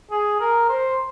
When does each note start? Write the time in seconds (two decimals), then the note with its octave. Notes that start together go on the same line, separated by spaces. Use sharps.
0.11 G#4
0.40 A#4
0.69 C5